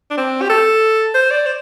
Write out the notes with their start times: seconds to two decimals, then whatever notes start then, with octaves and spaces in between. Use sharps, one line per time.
0.10 D4
0.17 C4
0.42 G4
0.49 A4
1.14 C5
1.31 D5
1.46 C5